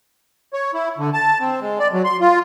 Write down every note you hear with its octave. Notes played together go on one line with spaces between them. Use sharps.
C#5
E4
D3
A5
C4
G#3
D5
F#3
C6
F4